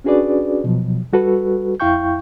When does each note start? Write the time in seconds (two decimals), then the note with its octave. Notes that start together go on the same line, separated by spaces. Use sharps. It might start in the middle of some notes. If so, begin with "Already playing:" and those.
0.04 C#4 D4 F#4 G#4 B4 D5
0.64 B2 F3 F#3
1.13 G3 F#4 A4 B4
1.80 F2 E4 F5 G5 C#6 G6